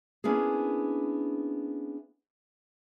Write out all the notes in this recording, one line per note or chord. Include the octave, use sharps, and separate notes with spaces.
A#3 B3 C#4 D4 E4 G#4